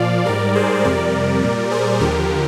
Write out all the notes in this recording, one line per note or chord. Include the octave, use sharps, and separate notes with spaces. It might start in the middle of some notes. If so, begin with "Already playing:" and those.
Already playing: A#2 F3 D5 F5
G#2 G3 A#4 D5
G#4 C5
F2 C3 G3 A#4 D5
A#2 G3
G#4 C5
D#2 D3 F3 G4 A#4